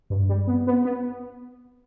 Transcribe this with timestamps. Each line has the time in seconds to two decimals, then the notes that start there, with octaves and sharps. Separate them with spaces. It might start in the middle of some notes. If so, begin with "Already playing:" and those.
0.10 G2
0.29 G3
0.47 B3
0.67 B3
0.85 B3